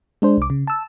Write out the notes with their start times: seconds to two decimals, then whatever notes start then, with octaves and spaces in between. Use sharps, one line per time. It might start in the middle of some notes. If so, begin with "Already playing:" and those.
0.22 G#3 D4 C5
0.38 C2 D6
0.50 C#3
0.67 A5 E6